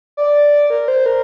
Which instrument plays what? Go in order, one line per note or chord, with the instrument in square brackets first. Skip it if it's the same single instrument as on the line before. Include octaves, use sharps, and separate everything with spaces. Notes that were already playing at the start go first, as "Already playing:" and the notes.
[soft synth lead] D5
A#4
C5
A#4